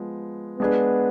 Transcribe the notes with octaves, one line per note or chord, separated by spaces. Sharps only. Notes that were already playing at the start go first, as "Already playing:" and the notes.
Already playing: F3 G#3 B3
G#3 B3 D4 G#4 B4